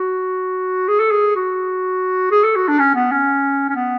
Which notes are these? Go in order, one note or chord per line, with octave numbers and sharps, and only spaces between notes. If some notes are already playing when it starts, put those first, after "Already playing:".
Already playing: F#4
G#4
A4
G#4
F#4
G#4
A4
F#4
D4
C#4
B3
C#4
C#4
B3